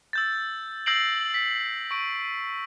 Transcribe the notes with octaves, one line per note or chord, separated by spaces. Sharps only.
E6 G6 A6
E6 G6 A#6 C7 D7 F#7
B6
C#6 D7